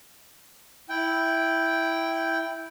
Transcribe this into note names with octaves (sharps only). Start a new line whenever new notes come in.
E4 G5